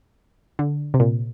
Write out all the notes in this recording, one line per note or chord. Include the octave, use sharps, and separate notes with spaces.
D3
C3
A#2